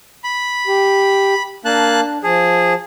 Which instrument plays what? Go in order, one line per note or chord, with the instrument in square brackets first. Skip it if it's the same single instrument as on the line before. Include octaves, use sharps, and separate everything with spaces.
[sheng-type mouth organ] B5
[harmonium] G4
[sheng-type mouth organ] A#3 A5 F#6 [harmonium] D4
[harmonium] F3 A5 [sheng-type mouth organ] G#4